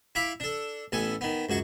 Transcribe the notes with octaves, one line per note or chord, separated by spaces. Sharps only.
E4 F5 B5 D6
D4 A4
A1 B3 A4 G#5
D#3 B3
C#2 F#2 F#4 C#6